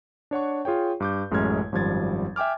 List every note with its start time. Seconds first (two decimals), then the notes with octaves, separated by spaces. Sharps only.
0.31 D4 C#5 F#5 C#6
0.65 F4 G#4 C#5 G5
1.00 G2 D6 G6
1.31 A1 F#2 G#3 A3 F6 G#6
1.72 G#1 F#2 F3 G3 G#6 A6
2.36 E5 G5 G#5 D6 F6